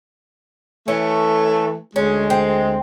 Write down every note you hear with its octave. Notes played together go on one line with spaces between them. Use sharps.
E3 A3 C#4
D2 G#3 C#4
C4